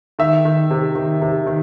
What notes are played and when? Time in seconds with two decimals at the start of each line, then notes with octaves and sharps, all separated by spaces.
0.19 D#3 E5
0.45 D#3
0.71 C3
0.95 D#3
1.22 C3
1.46 D#3